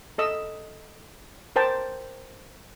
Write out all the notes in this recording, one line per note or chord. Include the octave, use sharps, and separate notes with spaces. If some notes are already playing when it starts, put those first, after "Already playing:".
A4 D#5 E6
A#4 C5 G5 A5